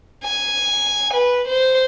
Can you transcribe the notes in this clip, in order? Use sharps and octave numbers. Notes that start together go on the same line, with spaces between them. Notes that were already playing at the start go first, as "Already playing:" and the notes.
G#5
B4
C5